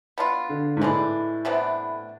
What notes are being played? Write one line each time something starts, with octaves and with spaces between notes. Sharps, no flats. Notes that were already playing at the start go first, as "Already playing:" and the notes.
B3 D4 F4
D3
G#2
A2 E3 G#3 D4
C3 E3 B3 D4